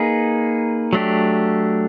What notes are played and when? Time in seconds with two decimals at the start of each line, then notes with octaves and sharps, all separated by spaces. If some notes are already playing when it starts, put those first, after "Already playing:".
Already playing: A#3 D#4 G#4 B4
0.93 F#3 A3 D4 G4